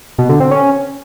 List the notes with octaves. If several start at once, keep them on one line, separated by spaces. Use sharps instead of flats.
B2
D3
C4
C#4